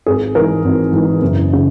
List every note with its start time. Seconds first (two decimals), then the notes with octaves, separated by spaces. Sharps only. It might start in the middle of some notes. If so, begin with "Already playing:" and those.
0.06 G#1 G#4
0.35 G#2 E3 A#4
0.64 G#1
0.92 G#2 E3
1.22 F#1
1.53 C#3